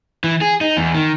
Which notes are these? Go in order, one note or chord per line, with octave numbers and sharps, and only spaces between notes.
E3
G#4
D#4
E2
D#3